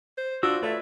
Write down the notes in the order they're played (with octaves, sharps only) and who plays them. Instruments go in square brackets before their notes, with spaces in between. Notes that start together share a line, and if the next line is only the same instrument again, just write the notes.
[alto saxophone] C5
[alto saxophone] D4 [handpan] F4 [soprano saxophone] F#4 [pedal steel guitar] E6
[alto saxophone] A3 [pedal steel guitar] B4 C#5 E5 [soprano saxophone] D5